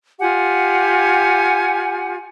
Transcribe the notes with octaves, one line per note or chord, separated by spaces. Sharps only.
F4 G4 F#5 G#5